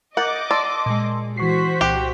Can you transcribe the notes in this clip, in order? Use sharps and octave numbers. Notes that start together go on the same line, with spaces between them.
A#4 D#5 F#5 D6 G6 A6
D5 A5 C6 E6
A#2 G#3
E3 F#4 C5 C#6 B6 C7
C2 A#2 G4 F#6